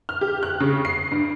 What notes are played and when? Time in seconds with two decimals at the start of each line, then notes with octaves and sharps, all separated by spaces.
0.09 F6
0.21 G4
0.43 F#6
0.60 C#3
0.85 C7
1.12 G2